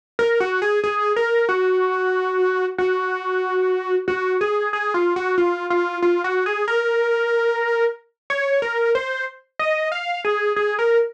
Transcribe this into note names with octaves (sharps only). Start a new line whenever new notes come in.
A#4
F#4
G#4
G#4
A#4
F#4
F#4
F#4
G#4
G#4
F4
F#4
F4
F4
F4
F#4
G#4
A#4
C#5
A#4
C5
D#5
F5
G#4
G#4
A#4